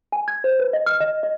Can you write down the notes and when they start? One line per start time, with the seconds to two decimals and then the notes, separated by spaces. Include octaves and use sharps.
0.12 G#5
0.28 G#6
0.44 C5
0.60 B4
0.73 D#5
0.86 F6
1.00 D#5
1.23 D#5